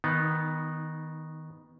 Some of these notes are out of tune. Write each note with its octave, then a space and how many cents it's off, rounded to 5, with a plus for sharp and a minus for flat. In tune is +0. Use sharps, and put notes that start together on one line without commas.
D#3 +15 B3 +0 D#4 -15